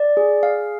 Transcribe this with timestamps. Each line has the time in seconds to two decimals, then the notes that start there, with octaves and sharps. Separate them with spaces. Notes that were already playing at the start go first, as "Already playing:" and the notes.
Already playing: D5
0.17 G#4
0.43 F5